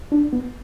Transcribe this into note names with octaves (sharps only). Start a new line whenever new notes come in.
D4
B3